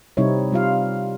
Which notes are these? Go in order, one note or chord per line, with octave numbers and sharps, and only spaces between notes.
C3 G3 C4 D#4 E4 C#5
G3 F4 F5